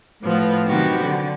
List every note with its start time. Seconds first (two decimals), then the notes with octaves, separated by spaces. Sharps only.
0.22 A2 F3 B3
0.66 C3 D#3 F#3 B3 F#4 G4
1.02 D3